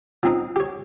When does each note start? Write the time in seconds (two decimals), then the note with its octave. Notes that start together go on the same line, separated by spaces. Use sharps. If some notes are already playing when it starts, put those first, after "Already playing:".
0.23 F3 C4 D#4
0.56 G4 C#5